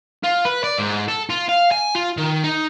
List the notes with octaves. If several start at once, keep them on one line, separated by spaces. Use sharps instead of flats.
F4
B4
D5
G#2
A4
F4
F5
G#5
F4
D#3
D#4